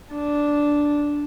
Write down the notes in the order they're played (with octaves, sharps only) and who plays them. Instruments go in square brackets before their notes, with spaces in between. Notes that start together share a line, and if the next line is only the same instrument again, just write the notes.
[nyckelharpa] D4